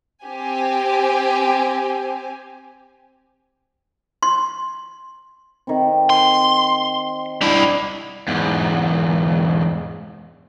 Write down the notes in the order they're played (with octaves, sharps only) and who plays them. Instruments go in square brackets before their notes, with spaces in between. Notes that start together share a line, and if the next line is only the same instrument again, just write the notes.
[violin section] C4 G4 G#5
[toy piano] C6
[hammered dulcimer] D#3 C4
[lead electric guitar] C6
[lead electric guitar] G3 E4 [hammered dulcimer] D4
[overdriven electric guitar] E2 G#2